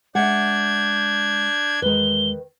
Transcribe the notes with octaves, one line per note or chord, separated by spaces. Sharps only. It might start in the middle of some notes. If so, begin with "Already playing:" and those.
G#3 D4 E5 F#5 G6 G#6
E2 D#3 G#3 B4 G7